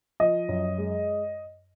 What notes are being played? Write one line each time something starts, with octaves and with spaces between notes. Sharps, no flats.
F3 D#5
F#2
G#3